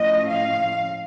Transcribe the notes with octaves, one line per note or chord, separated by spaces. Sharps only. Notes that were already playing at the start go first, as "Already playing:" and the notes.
Already playing: A2 F3 A3 C#4 D#5
F5